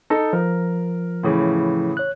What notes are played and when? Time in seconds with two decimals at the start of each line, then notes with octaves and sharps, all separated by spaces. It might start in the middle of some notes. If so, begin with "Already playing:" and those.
0.10 D#4 A4
0.33 F3 A#4
1.23 A2 C#3 E3
1.97 C#5 F#6